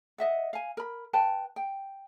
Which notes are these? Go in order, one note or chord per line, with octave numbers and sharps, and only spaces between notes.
D#5 E5 F#5
F5 G#5
A#4 B5
B4 G5 A5
G5